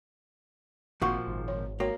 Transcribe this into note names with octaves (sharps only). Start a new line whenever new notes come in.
G#1 A#2 F3 F#4 F#5 C#6
G#1
C#5
A#3 F#4 C#5